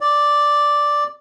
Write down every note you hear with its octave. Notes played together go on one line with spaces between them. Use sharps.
D5